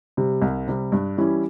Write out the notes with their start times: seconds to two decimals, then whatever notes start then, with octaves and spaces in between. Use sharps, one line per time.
0.17 C3 G3
0.42 C2
0.67 C3 G3
0.92 G2
1.17 E3 G3 C#4 E4